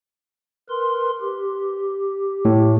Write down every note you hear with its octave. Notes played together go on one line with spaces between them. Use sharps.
A#4 B4 C6
G4
A2